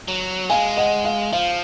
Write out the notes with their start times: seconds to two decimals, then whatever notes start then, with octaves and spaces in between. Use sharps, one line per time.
0.08 F#3
0.50 G#3 F5 G#5
0.77 D#5 F#5
1.04 F5
1.33 F3 F5